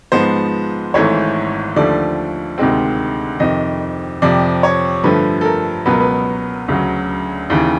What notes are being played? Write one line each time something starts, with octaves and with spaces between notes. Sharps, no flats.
G#2 F3 G#3 B3 C5
G#1 G#2 E3 A3 C#5
D#2 D3 F3 A3 D5
D2 C3 D#3 G#3 C4
F2 C3 D#3 D#5
F2 C3 F3 D5
C#5
G2 D3 F3 A3 B4
A4
A#4
C#2 B2 F#3 B3 B4
A#4
B4
D2 C#3 F#3
D#2 C#3 E3